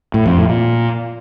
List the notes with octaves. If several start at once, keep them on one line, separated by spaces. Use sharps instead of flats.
A2
F2
A2
A#2